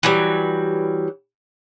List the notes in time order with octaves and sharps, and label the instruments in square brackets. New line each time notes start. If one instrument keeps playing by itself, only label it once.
[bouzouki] E3 F#3 G3